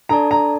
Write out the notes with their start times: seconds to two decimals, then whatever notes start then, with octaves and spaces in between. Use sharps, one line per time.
0.09 D4 A4 D5 A5 A#5
0.31 A#5